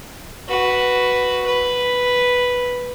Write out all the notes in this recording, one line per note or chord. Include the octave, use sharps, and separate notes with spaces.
F#4 B4
B4